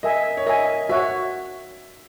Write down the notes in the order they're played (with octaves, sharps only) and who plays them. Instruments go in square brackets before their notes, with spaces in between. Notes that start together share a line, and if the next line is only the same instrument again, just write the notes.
[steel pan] A#4 E5 G#5 [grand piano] D#5
[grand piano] C#5
[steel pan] A#4 E5 G#5 [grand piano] D#5
[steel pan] F#4 C#5 F#5 [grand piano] E5